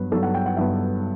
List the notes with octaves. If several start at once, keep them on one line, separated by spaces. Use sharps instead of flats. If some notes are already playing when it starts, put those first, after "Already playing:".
Already playing: G2 F#3 B3 B4
G2 F#3 B3 A4
F#5
G5
F#5
G2 F#3 B3 E5